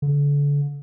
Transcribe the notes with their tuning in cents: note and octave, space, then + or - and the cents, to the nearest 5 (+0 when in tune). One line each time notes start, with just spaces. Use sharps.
D3 -35